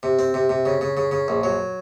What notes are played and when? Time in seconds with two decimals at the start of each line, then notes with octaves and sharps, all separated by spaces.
0.03 C3
0.19 C4
0.34 C3
0.49 C3
0.66 C#3
0.81 C#3
0.97 C#3
1.11 C#3
1.28 A#1
1.43 F#3